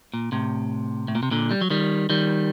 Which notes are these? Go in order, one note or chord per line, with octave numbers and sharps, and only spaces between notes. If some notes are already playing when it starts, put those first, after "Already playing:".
A#2
A2 C3
A2
A#2
C3
A#2 D3
G3
F#3
D#3 G3
D#3 G3